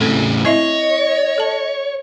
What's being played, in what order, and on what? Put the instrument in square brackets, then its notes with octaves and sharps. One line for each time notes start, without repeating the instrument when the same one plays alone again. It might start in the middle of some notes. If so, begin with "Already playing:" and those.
[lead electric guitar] A2 C#3 [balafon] C4 A4
[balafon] C4 E4 E5 [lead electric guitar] C#5 [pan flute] D#5
[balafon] A4 A5